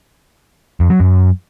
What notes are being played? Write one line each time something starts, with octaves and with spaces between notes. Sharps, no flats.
F2
F#3
F#2